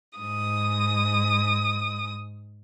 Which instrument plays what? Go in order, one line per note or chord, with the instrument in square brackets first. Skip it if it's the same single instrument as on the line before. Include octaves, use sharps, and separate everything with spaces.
[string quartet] G#2 D#6